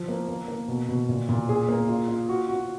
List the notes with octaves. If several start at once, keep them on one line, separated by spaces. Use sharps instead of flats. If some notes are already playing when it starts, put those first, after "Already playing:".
Already playing: F3
A#3
A#3
A#3
B2
B2
A#2
A#2
G#4
A#3
F4
F4
F#4
F#4